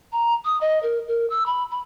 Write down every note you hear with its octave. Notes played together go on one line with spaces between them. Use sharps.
A#5
D#6
D#5
A#4
A#4
E6
B5
B5